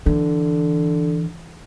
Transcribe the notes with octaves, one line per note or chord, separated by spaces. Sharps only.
D3 E3